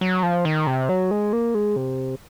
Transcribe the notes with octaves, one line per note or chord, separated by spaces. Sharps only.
F#3
F3
D#3
C3
F#3
G#3
A#3
G#3
C3